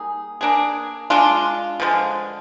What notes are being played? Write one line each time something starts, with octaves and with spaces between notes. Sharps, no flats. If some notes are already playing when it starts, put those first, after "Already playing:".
Already playing: G3 A#3 D#4 G#4
A#3 D4 G#4
G#3 D4 F4
D3 F3 G#3